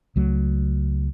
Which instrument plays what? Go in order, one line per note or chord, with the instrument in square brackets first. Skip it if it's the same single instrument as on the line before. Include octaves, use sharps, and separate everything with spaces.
[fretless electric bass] C#2 F#3 A3